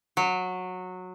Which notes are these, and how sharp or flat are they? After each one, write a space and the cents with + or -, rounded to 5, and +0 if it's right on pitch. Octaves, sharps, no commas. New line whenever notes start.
F#3 -15